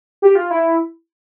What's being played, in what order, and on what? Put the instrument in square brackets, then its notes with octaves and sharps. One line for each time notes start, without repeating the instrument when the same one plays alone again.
[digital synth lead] G4
F4
E4